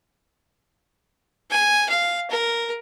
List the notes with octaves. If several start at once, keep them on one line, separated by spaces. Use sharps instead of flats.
G#5
F5
A#4